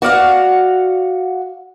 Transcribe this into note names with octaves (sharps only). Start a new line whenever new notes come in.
F#4 D5 F5 F#5